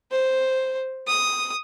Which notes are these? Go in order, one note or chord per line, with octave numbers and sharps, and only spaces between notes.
C5
D#6